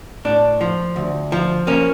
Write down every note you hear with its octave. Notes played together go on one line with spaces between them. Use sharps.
A2 D4
F3
D2
F3
A#3 C#4